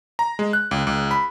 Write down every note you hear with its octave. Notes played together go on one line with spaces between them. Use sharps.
A#5
G#3
F#6
C#2
C#2
B5